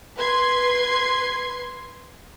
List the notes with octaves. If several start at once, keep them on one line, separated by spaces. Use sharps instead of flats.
B4 C6 G#6 C7